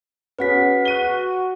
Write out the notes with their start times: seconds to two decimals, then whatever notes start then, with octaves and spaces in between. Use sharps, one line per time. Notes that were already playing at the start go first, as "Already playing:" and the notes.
0.39 C#4 F#4 G#4 B4 F#5 B6
0.85 F#4 F#6 D#7 G7